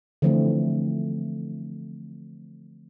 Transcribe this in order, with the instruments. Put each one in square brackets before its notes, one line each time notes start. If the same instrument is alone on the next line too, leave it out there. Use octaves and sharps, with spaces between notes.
[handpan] D3 E3 F3 A3 C4